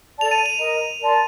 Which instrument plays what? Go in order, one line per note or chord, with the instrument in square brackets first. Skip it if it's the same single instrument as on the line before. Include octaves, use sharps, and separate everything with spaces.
[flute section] A4 D5 A5 [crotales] F7
[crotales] D#7
F7
[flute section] A#4 D#5 A#5 [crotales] D#7
[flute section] A#4 D5 A5 C6